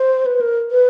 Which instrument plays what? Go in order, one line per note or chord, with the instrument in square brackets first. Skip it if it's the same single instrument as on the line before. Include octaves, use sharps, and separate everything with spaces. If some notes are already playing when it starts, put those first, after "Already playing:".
Already playing: [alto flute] C5
B4
A#4
B4